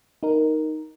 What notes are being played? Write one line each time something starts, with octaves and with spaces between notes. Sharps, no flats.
D#4 A#4